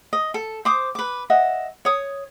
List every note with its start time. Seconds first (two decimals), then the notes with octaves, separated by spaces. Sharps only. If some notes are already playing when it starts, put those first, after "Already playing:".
0.13 D#5
0.34 A4
0.65 C5 D6 D#6
0.95 B4 D6
1.30 D#5 E5 F#5
1.85 C#5 D#6